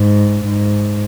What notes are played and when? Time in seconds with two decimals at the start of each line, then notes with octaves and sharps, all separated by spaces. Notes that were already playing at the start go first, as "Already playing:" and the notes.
Already playing: G#2
0.44 G#2